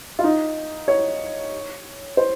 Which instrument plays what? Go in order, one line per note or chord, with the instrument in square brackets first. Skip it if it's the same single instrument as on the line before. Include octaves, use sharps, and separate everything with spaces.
[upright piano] F4
D#4
C#5
C5